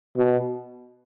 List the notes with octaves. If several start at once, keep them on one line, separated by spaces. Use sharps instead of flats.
B2